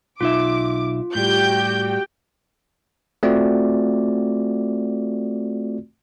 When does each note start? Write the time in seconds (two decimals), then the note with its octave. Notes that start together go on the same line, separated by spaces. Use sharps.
0.21 B1 D#4 F4 E5 D6
1.15 A2 G3 F#4 G4 G5 G6
3.23 A3 C4 F4 F#4 D5